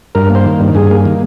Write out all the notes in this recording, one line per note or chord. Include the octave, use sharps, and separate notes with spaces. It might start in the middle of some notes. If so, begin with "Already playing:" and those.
G2 A#4
A#3
C5
D#3
G2
G2 G#4
A#3
D#3